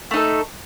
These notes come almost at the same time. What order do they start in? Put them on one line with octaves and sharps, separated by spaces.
A3 D#4 A4